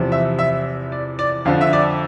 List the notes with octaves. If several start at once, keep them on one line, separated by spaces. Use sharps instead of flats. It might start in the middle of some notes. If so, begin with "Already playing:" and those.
Already playing: E2 C3 F3
E5
E5
D5
D5
F2 D3 F3 F5
E5
D5